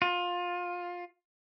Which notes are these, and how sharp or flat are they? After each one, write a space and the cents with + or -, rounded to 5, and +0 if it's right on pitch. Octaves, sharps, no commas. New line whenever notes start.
F4 +20